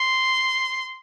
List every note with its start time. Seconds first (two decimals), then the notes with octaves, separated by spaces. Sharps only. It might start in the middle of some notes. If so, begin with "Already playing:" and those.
Already playing: C6